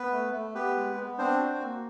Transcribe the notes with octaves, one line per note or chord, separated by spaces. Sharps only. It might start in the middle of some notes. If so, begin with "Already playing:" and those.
Already playing: B3 B4
A3
A3
B3 G4 B4
G#3
B3
C4 D4 C5
F#4
A#3